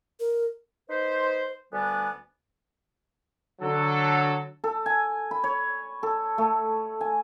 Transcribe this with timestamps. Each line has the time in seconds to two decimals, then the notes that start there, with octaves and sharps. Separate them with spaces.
0.20 A#4
0.89 D#4 B4 C5
1.72 D2 G3 B3 D4 G#5
3.61 D3 F#3 A4
4.64 A4
4.86 G#5
5.31 B5
5.44 C#5
6.03 A4
6.38 A3
7.01 G#5